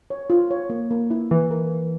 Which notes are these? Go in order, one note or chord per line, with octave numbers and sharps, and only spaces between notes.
C#5
F4
C#5
A#3
A#3
E4
E3 E4
A#4
A#4